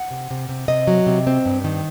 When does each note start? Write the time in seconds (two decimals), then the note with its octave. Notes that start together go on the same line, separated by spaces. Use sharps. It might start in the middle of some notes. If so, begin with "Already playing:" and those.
Already playing: F#5
0.11 C3
0.31 C3
0.49 C3
0.68 C3 D#5
0.87 F#3
1.07 C3
1.27 C4
1.46 G2
1.64 D#3